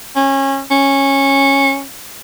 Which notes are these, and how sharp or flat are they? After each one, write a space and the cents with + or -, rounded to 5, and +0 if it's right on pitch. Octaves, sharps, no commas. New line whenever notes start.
C#4 -25
C#4 -15